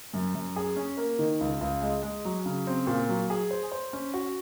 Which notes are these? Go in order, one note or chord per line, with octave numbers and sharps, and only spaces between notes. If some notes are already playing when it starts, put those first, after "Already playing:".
F#2
F#2
G#4
C#4
A#3
D#3
C#2
C#2
G#3
G#3
F#3
C#3
C4
A#2
F#3
G#4
C5
C5
C#4
F#4